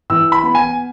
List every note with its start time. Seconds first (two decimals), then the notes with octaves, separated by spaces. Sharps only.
0.10 E3 E6
0.32 B5
0.43 B3
0.55 G#5